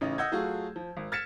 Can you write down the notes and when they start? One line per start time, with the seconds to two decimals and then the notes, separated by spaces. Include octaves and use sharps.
0.01 A1 C#3 C#4 D#4
0.18 D#5 F#5 E6 G6 G#6
0.32 F#3 A3 F4 F#4 G#4
0.76 F3
0.97 G#1
1.12 F6 G#6 A6 B6 C#7 E7